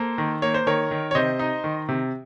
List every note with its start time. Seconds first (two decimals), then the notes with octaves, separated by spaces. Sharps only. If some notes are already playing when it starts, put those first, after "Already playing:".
Already playing: A#3 A4 C5
0.18 D#3
0.42 A#3 C#5
0.54 C5
0.67 D#3 A#4 C#5
0.91 D#3
1.11 C#5
1.15 C3 C5 D#5
1.39 D#4
1.64 D#3
1.89 C3